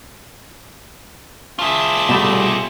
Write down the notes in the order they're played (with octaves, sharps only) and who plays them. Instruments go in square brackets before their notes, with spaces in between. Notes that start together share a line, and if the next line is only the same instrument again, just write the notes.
[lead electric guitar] F4 G#4 [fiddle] E5 A5
[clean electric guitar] B2 G3 A3